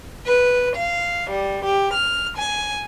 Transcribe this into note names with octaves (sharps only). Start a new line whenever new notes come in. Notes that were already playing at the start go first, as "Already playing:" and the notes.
B4
F5
G3
G4
F6
G#5